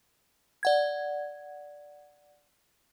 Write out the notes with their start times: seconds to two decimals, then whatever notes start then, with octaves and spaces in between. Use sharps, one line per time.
0.63 D5 F#5 G#6